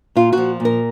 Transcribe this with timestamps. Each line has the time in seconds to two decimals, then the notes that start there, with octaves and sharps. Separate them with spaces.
0.15 A#2 F4
0.33 F3 F#4
0.60 A#2
0.65 A#4